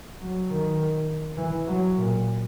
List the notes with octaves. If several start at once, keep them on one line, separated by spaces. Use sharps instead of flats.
F#3
D#3
E3
F#3
A#2